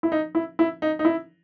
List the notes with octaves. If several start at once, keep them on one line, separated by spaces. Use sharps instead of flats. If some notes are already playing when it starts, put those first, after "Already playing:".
E4
D#4
E4
E4
D#4
D#4
E4